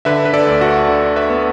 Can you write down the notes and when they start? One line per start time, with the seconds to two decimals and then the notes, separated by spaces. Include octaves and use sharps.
0.05 D3 B4 E5
0.25 B4
0.34 A4 D5
0.47 D2
0.61 F#4
0.88 D3
1.16 B4 E5
1.30 B3